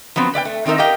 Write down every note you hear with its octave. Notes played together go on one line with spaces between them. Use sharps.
F3 F#3 B3 C4
B4 D5 F5 G5
A3
D#3 C4 D#4 A#4 E5
G4 A#4 D#5 F5 G5